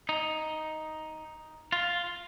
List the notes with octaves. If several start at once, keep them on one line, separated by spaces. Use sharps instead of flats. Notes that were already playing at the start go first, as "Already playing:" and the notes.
D#4
F4